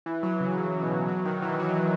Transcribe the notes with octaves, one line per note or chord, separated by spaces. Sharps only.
E3
F#3
C#3
C#3
B2
F#3
D#3
E3
F#3